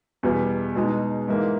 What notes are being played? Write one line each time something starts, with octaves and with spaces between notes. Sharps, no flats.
E2 B2 G3 B3
B2 G#3 D#4 G#4
G#2 E3 A#3